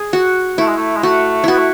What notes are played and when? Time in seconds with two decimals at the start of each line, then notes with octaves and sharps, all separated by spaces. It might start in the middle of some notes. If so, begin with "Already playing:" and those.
Already playing: G#4
0.13 F#4
0.58 A3 E4
0.68 G#3
0.77 A3
0.97 G#3
1.03 A3 F#4
1.44 B3 E4 F#4
1.58 A3